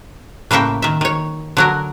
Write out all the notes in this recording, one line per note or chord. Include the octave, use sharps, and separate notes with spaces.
A2 C#3 A#3 E5 G5
D#3 E5
D#3 C#5
D3 F#3 A#4